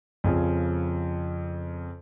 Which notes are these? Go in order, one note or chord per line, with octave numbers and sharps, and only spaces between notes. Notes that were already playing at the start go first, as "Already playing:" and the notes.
F2 C#3 F3